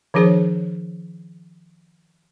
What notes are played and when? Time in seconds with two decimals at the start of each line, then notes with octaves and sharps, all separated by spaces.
0.14 D#3 F3 D4 G#4 C5 C#5